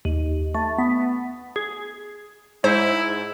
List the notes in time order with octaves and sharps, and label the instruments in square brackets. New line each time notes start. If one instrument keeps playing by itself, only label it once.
[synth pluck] D#2
A3
B3
G#4
[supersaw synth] G#2 [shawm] E4 [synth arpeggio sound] C5